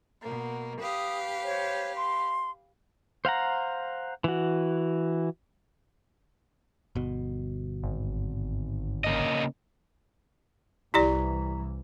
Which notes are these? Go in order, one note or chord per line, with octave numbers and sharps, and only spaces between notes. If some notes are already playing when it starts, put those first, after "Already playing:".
B2 A#3
G4 B4 F5 D#6
C5 C#5
C6
C5 F5 F#5 A#5
E3 F#4
G1 B2
G#1
C#3 A#3 D#5
C2 E3 E4 G4 D5 A#5 C#6 B6